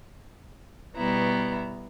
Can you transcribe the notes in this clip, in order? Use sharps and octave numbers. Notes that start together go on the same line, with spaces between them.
B2 G3 B3 E4 A#5